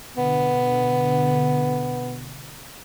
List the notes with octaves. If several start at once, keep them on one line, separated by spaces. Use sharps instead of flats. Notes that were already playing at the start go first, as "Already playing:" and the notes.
B2 D3 B3